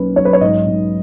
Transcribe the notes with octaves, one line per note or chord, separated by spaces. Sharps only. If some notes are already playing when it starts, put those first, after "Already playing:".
Already playing: B1 A#3 C#4 B4
B1 C#5
B4
C#5
G#2 D#5
G#2